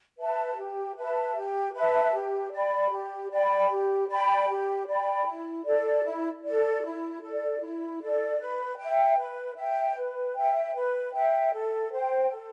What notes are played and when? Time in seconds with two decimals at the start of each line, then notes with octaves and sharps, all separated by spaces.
0.18 B4 E5 A5
0.56 G4
0.96 B4 E5 A5
1.35 G4
1.73 B4 E5 A5
2.13 G4
2.52 D5 G5 B5
2.91 G4
3.30 D5 G5 B5
3.70 G4
4.09 D5 G5 B5
4.48 G4
4.87 D5 G5 B5
5.26 E4
5.65 A4 D5
6.04 E4
6.43 A4 D5
6.83 E4
7.22 A4 D5
7.61 E4
8.00 A4 D5
8.39 B4
8.78 E5 G5
9.18 B4
9.56 E5 G5
9.96 B4
10.35 E5 G5
10.75 B4
11.13 E5 G5
11.52 A4
11.91 C5 G5
12.30 A4